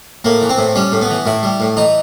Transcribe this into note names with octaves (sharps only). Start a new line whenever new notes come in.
A2 A#3
E3
C4
A2
G3 C#4
A2
B3
E3
A2 E4
G3
A2
E3 D#4